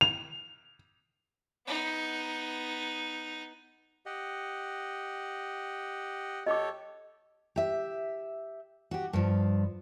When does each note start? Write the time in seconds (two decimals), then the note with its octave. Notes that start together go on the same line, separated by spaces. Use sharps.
0.01 F7
1.67 B3 D#4
4.06 G4 D#5 F#5
6.47 G4 A4 C#5 D#5 D6
7.56 G4 E5
8.91 F#4 G4
9.13 G2 F3